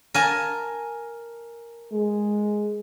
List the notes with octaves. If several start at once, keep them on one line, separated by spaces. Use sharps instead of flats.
A#4 G#5 A5
G#3